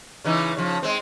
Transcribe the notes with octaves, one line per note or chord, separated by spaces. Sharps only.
C#3 E3 D#4
C#3 F3
G#3 C4